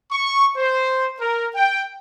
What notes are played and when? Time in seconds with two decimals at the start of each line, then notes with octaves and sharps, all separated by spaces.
0.12 C#6
0.58 C5
1.21 A#4
1.56 G5